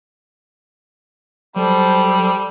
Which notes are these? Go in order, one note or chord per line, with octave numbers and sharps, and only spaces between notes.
F#3 G3 A4 C5